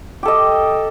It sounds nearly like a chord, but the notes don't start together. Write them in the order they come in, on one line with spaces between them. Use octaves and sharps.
G4 A4 D#5